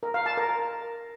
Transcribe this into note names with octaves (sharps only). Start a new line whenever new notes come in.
A#4
F5
A5
A#4